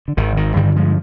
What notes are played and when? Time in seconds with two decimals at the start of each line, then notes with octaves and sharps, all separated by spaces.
0.08 D3
0.17 G#1 D#3
0.37 D#3
0.56 G2 D3 D#3 G3
0.76 F3 G#3